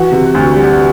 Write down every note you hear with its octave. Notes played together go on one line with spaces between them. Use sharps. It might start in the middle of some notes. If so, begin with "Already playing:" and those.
Already playing: E3 F#4
C3
D2
G3